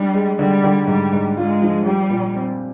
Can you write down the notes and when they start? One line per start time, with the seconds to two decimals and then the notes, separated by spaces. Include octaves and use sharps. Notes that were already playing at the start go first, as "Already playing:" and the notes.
Already playing: G3 D4
0.14 G#3
0.39 D3 G3
0.64 D3
0.87 G#2 G3
1.12 G#2
1.37 G#3 F4
1.62 F3
1.86 G3 G4
2.10 A#2
2.35 C4